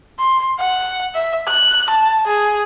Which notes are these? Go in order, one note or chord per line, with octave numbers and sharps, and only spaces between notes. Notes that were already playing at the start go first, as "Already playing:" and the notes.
C6
F#5
E5
F#6
A5
G#4